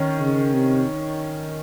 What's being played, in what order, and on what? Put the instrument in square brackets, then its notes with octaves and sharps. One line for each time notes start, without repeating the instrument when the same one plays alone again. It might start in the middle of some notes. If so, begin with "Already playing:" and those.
Already playing: [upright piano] D#3 C#4
[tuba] C#3
C3